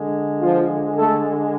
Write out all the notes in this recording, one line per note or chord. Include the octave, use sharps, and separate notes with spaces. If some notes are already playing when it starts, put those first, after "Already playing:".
Already playing: D3 G#3
F3 F4
A3 A4